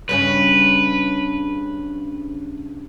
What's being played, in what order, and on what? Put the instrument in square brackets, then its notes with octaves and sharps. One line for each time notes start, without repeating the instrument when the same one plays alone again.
[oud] G2 C#3 C#4 [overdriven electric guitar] B4